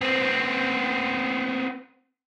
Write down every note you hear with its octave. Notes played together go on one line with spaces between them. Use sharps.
B3 C4